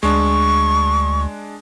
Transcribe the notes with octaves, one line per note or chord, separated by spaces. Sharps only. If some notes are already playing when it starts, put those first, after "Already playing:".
D2 G#3 D4 C#6